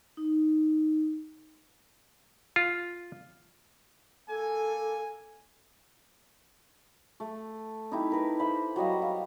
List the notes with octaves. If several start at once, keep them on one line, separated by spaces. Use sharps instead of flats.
D#4
F4
A#3 A4 G#5
A3
D#4 E4 G4
A#4 B4
C5 E5 B5
F#3 G3 D#5 F5
F5